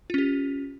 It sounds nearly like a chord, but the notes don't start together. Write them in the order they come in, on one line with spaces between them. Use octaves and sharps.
F4 C#4 G4